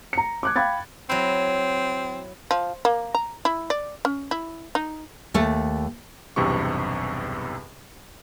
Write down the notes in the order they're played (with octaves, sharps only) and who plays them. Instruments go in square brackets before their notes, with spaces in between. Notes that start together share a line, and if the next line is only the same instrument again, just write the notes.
[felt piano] A#5 C#7
D6 F#6 G#6
F5 G5 B5 G#6 A6
[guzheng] F#3 E4 [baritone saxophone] C4
[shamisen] F3
A#3
A#5
E4
D5
C#4
E4
D#4
[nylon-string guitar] D#2 A3
[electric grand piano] B1 E2 G2 C3 G4 C#6